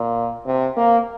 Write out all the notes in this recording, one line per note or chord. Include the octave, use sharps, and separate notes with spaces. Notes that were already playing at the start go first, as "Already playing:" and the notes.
Already playing: A#2
C3
A#3